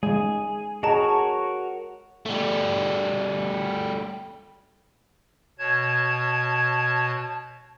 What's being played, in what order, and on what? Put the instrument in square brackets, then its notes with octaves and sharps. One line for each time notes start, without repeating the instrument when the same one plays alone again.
[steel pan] G#3 [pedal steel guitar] G#4
[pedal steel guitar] F#4 A#4 C#5 [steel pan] G#4 [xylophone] D#5 A5 A#5
[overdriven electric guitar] G3 A3
[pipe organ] B2 C#5 A5 G#6